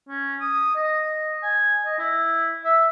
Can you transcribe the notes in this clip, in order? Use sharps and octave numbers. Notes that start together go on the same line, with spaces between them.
C#4
D#6
D#5
G#5
D#5
E4
E5